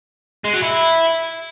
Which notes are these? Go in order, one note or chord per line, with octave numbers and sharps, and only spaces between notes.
G#3
F#3
E4